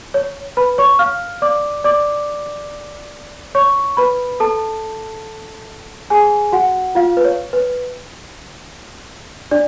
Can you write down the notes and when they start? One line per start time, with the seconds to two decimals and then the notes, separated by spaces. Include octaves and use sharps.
0.14 C#5
0.57 B4 B5
0.78 C#5 C#6
0.99 F5 F6
1.42 D5 D6
1.84 D5 D6
3.55 C#5 C#6
3.97 B4 B5
4.40 A4 A5
6.10 G#4 G#5
6.53 F#4 F#5
6.95 F4 F5
7.17 B4
7.25 C#5
7.53 B4
9.51 D4 D5